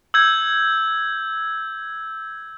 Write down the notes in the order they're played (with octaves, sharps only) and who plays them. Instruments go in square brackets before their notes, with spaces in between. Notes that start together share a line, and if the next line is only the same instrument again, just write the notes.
[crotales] E6 G6 G#6